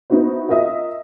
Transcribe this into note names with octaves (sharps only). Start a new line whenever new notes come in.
B3 D#4 E4 F#4 C5
F4 A#4 D#5 E5 D#6